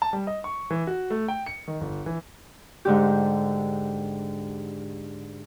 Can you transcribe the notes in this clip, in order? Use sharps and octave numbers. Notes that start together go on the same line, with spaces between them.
A5
G3
D#5
C#6
E3
F#4
A3
G5
C#7
D#3
G1
E3
G#2 D3 G4